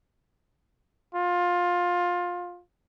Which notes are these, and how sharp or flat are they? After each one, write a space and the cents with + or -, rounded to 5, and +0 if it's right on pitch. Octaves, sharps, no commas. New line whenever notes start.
F4 +20